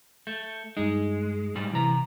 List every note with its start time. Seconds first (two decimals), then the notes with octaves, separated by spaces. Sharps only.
0.27 A3 G6
0.77 G2 G#3 D#4
1.55 G#2 G3
1.73 C3 E3 A#5